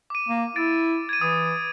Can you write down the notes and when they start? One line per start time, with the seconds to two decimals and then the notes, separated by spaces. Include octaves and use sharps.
0.10 D6 D#7
0.29 A#3
0.56 E4 A6 D7
1.09 G#6 D#7
1.21 E3 D#6